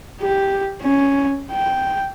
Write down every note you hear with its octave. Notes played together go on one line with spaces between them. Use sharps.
G4
C#4
G5